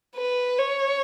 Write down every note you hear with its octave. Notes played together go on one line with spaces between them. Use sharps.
B4
C#5